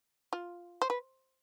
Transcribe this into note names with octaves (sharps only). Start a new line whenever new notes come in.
F4
C5
B4